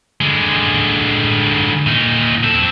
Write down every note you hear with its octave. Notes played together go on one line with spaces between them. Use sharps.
D3 G#3
A#2 D#4
C4 A4